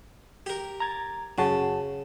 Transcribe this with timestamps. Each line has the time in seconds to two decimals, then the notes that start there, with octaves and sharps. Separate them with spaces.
0.46 G4 A#4
0.80 A#5 G#6 A6
1.38 F#2 C#3 F#4 A5